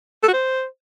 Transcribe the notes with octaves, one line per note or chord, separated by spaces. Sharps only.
A4
F#4
C5